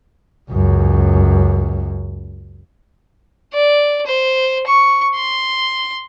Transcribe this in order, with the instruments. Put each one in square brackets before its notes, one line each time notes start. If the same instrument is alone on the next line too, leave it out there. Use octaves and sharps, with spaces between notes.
[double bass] C#2 F#2
[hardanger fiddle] D5
C5
C#6
C6